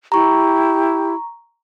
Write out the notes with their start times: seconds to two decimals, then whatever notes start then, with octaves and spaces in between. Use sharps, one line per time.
0.12 E4 G4 A#5 C#6